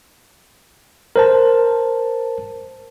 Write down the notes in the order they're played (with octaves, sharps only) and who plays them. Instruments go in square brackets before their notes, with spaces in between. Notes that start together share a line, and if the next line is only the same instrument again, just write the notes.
[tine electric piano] A#4 C5 A5